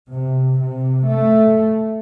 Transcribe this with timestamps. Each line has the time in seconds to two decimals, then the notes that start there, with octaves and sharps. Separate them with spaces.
0.13 C3
0.63 C3
1.12 A3